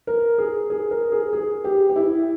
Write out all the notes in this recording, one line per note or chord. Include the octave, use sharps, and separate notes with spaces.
A#4
G#4
G#4
A#4
G#4
G#4
G4
G4
E4